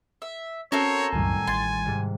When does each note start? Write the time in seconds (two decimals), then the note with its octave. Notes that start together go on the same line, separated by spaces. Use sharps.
0.22 E5
0.72 C4 C#4 F#4 A4 A#4 C#5
1.13 C2 F#2 A2 D#3 G3 G#5
1.47 A1 C6 G#6 A6
1.85 G#2 C3